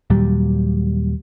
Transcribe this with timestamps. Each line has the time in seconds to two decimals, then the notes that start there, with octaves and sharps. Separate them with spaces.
0.10 D#2 A#2 F#3 G3